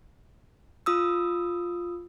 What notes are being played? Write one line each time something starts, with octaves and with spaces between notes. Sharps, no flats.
F4 D#6 E6